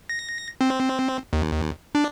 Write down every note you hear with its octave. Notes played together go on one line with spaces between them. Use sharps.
A#6
C4
D#2
D4